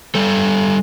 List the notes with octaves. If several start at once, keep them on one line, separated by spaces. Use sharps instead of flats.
G3 A4